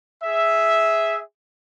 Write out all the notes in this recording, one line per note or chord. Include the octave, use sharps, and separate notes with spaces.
G#4 E5